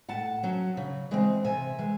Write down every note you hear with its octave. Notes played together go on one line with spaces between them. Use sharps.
A2 F#5 A5
F#3 C#4
C#3
E3 G#3 C4
C3 E5 G#5
E3 G#3